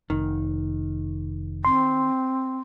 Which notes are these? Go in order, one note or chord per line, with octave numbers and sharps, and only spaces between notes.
F1 D#3
C4 C6